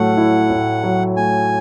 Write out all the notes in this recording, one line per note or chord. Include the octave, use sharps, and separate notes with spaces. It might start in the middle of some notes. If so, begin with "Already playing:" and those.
Already playing: A2 F#3 A3 F#5
E4
A2
F#3
A3 G#5